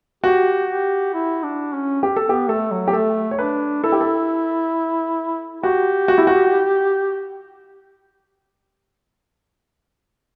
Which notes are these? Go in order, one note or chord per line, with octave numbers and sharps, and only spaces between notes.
F#4 G4
G4
E4
D4
C#4
G4
A4
B3 G4
A3 A4
F#3
G4
A3 A4
C#5
D4 B4
E4 A4
G4
A4
F#4 G4
F#4
E4
F#4